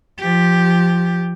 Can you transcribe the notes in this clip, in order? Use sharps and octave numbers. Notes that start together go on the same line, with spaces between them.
F3 G4